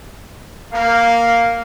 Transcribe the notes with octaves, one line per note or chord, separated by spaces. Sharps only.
A#3 F5